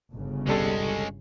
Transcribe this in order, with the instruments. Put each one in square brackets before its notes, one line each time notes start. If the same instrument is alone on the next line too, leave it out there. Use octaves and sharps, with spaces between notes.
[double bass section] G1 C#3
[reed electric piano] C2 G3 A4 [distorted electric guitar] G#3 C#4